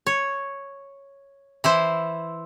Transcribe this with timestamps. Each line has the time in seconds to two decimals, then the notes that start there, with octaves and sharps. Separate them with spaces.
0.07 C#5
1.64 E3 E4 C5